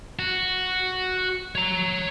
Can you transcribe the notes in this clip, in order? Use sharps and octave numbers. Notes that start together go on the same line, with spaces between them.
F#4
C#5 A#5